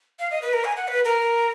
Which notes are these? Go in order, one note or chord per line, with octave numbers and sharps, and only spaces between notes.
F5
D#5
B4
A#4
G#5
F#5
B4
A#4